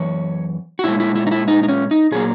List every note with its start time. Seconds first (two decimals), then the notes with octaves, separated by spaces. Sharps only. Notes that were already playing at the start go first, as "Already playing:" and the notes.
Already playing: F#2 E3 C#5
0.79 F#4
0.84 A#2 G#3 E4
1.00 E4
1.16 E4
1.27 D#4
1.31 E4
1.48 D#4
1.63 D#4
1.68 C#4
1.91 D#4
2.12 A#2 F#3 A#3 G#4